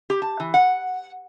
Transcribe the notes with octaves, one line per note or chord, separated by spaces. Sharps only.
G4
A5
E3
F#5